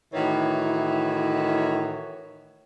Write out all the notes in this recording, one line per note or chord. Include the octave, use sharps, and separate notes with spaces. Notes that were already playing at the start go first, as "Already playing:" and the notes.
A2 D#3 E3 F#4 C#5